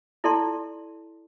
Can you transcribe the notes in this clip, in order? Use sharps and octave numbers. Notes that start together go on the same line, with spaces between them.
E4 A4 D5 A5 C6